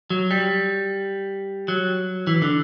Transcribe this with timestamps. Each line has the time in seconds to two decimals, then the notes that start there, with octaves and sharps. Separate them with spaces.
0.10 F#3
0.31 G3
1.68 F#3
2.27 E3
2.42 D3